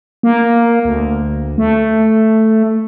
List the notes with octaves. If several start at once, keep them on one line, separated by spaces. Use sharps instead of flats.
A#3
D2
A3